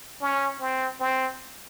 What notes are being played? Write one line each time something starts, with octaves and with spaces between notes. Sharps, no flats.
C#4
C4
C4